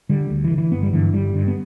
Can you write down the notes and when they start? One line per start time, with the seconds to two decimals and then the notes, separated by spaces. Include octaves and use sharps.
0.09 D3 G3
0.30 D2
0.44 E3
0.51 D3
0.58 E3
0.72 G1 B3
0.83 G3
0.93 G2 D3 E3
1.13 G1 G3
1.34 G2 D3
1.48 B3